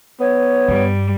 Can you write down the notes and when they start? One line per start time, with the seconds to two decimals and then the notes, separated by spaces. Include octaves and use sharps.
0.20 B3 C#5
0.69 G2 G3